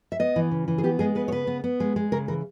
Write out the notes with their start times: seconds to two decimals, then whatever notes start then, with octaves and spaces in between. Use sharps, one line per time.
0.12 E5
0.19 B3 D#5
0.36 E3
0.51 C#3
0.68 E3
0.78 G#4
0.83 B3 G4
0.99 G#3 G#4
1.15 B3 B4
1.28 C#5
1.32 C#3 B4
1.47 B3
1.64 B3
1.80 G#3
1.96 G#3
2.12 C#3 A#4
2.28 E3 A#4